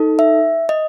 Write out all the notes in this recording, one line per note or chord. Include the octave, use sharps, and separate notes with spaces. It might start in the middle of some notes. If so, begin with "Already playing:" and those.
Already playing: D#4 A4
E5
D#5